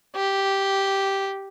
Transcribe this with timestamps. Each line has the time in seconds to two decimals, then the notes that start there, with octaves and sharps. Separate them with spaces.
0.16 G4